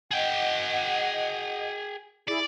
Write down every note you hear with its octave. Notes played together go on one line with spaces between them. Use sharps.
G#4 D#5 F#5 G5
E4 G#4 D5